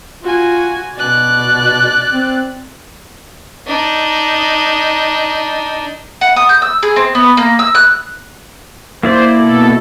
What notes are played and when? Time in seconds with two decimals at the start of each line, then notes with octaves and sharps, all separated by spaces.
0.24 F4 F#4 G#5
0.95 B2 D5 F#6
2.14 C4
3.67 D4 D#4
6.21 F#5
6.36 D#6
6.49 G6
6.62 E6
6.83 G#4
6.96 C4
7.15 B3
7.37 A#3
7.59 E6
7.75 F#6
9.03 A#3 E4 C5 D5
9.37 B2 A4